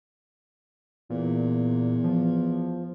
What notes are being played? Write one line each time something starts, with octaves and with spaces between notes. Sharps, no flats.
E2 A#2
F3